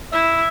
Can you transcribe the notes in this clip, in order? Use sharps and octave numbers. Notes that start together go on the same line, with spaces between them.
E4 E5